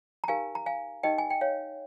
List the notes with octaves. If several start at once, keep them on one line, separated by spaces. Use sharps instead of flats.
A#5
D#4 G4 A#4 F5 G#5
A#5
F5 G#5
D#4 G4 A#4 D#5 G5
G#5
G5
C#5 F5